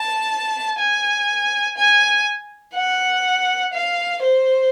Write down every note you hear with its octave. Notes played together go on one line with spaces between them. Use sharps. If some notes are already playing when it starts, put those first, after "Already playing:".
Already playing: A5
G#5
G#5
F#5
F5
C5